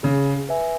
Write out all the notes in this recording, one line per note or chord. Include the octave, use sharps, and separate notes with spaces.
C#3 G#4
B4 E5 G#5